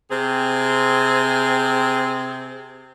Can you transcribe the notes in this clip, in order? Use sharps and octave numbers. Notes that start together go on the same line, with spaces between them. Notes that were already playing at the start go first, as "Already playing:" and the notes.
C3 C4 G#4